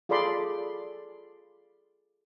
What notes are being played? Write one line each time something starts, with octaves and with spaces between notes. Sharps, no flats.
F4 G#4 A4 D5 B5 C6